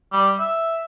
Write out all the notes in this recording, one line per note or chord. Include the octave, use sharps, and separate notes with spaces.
G3
E5